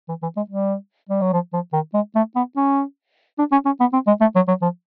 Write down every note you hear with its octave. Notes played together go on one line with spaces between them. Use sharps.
E3
E3
G#3
G3
G3
F#3
F3
F3
D#3
G#3
A3
B3
C#4
D4
C#4
C#4
B3
C4
G#3
A3
F#3
F#3
F3